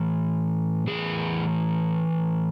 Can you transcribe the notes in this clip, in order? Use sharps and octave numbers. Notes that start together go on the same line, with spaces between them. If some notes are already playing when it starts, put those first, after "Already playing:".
Already playing: A2 E3
A2 E3 G#4